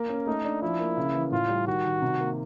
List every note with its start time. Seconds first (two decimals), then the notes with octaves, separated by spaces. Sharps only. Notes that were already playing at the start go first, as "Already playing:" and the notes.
Already playing: A#3
0.09 C#4
0.27 A3 D#4
0.44 D4
0.62 F3 E4
0.80 A#3
0.97 C#3
1.14 E3
1.32 A2 F4
1.49 G3
1.67 D#3 F#4
1.85 D#3
2.02 C3
2.20 A#3